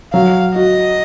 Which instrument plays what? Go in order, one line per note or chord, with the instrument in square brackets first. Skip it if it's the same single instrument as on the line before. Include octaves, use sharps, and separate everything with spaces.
[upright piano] F#3 [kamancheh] F5
[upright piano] F#4 [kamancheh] D#5